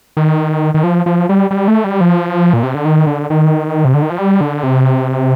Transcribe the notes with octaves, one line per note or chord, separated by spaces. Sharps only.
D#3
D#3
F3
F3
G3
G3
A3
G3
F3
A#2
C3
D3
D#3
D3
D#3
C3
D3
D#3
F3
G3
D3
C3